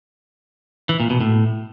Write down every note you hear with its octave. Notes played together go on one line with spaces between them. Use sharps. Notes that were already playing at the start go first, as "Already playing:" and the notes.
E3
A#2
B2
A2